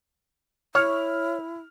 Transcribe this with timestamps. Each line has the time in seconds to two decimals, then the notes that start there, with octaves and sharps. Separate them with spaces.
0.75 E4 C#5 F6